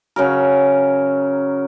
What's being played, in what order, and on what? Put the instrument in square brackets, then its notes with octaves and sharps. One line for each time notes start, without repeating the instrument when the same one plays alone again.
[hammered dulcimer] C#3 F#3 A#4